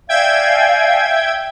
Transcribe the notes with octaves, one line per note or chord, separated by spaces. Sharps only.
D5 E5 F5 G5 G#5 G#6